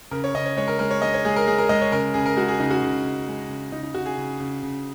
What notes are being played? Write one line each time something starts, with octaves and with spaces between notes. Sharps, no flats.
C#3 A#4
C#5
C#3 D#5
C#5
G#3 C#5
A#4
G#3 A#4
C#5
G#3 D#5
C#5
G#3 G#4
A#4
G#3 G#4
A#4
G#3 D#5
C#5
C#3 A#4
C#3 G#4
A#4
G#3 F#4
G#4
C#3 D#4
F#4
C#3
C#3
G#3
C#3
C#3 D#4
D#4
C#3 F#4
G#4
C#3
C#3
C#3